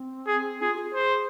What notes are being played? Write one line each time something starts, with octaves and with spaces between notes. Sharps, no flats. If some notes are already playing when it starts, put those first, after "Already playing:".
Already playing: C4
G#4
F4 G#4
G#4
C5